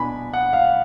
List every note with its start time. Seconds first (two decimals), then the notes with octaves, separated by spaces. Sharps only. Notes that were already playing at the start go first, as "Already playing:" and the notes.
Already playing: B2 D4 G#5 B5
0.33 F#5
0.53 F5